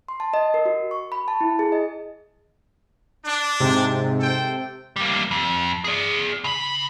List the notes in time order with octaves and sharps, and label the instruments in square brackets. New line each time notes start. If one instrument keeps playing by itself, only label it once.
[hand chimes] C6
A5
D#5
A#4
F#4
C#6
B5
A5
E4
G#4
D#5
[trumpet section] D4
[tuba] G#2 [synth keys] C3
[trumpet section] A4 C5 G5
[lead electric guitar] G3 A#3
F2
G#4 D5
C#3 B5